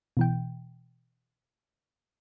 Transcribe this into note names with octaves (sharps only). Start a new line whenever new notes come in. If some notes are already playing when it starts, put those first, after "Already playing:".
B2 E3 G5